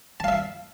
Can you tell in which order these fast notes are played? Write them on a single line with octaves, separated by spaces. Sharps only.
A5 F5 E5